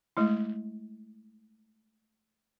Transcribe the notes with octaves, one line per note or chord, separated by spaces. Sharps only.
G#3 A3 E4